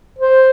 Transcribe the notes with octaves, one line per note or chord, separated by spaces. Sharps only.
C5